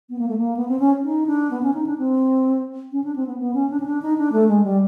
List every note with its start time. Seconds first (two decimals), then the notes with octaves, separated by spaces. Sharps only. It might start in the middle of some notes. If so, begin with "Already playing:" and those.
0.10 B3
0.19 A#3
0.28 A3
0.37 A#3
0.57 B3
0.68 C4
0.79 C#4
1.03 D#4
1.27 D4
1.51 B3
1.63 C#4
1.74 D#4
1.86 D4
1.98 C4
2.92 C#4
3.04 D4
3.16 C4
3.27 B3
3.39 B3
3.54 C#4
3.70 D4
3.80 C#4
3.86 D4
4.02 D#4
4.18 D4
4.32 A3
4.48 G#3
4.64 G3